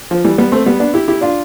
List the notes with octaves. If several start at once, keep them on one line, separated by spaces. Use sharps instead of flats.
F3
E3 G3
G3 B3
A3 C4
G3 B3
B3 D4
E4 G4
E4 G4
D4 F4